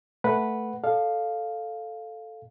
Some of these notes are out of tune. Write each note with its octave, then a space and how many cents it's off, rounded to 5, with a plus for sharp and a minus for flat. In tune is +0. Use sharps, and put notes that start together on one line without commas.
A3 +0 B4 -5 F#5 +0
A4 +0 D5 +45 F5 +0